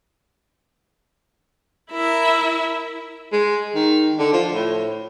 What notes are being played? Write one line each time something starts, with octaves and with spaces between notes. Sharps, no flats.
E4 A#4 E5
G#3
D#3
D3
F3
A2